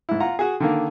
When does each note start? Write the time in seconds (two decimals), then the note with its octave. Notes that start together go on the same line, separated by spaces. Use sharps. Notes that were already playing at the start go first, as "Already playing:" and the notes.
0.09 G#2 E4
0.20 F4 F#5 A#5
0.39 F#4 G#4
0.60 D3 D#3 A#3